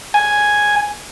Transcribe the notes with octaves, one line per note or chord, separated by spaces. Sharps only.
G#5